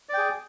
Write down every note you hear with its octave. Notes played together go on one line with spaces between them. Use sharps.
G#4 D5 G5